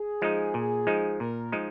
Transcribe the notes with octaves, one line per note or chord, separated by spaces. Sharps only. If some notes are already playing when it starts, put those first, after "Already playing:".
Already playing: G#4
F3 G#3 D#4
A#2
F3 G#3 D#4
A#2 A#4
F3 G#3 D#4